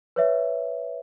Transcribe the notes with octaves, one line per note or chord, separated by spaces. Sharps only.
B4 C#5 E5